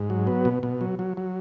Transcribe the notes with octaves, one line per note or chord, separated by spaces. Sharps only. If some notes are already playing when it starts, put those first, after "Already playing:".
Already playing: G#2
F#3
B3
B2
B2
F#3
F#3
F#3